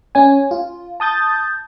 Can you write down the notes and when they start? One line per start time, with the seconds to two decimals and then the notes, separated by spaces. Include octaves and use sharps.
0.15 C#4 G#5
0.51 F4
1.00 A5 D#6 G6 A6